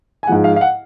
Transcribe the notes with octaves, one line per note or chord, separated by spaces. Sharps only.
G#5
G#2 F3 G#3 F#5
F5
F5
F#5